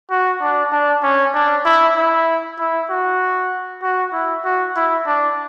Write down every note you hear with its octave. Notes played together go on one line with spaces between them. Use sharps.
F#4
D4
D4
C#4
D4
E4
E4
E4
F#4
F#4
E4
F#4
E4
D4